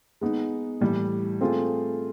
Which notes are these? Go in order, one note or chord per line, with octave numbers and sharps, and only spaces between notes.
G#3 B3 D#4
A2 E3 G3
A3 C4 F4 G#4